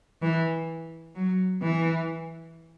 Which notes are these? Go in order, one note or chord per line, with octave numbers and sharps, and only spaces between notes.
E3
F#3
E3